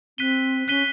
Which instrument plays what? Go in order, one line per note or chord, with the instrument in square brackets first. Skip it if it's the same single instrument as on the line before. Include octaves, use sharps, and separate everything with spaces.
[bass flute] C4 [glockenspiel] F#6 B6 D#7 G7
[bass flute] C#4 [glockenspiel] F#6 B6 D#7 G7